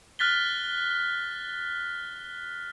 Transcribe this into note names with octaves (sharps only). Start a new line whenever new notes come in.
F6 F#6 A6 B6 G7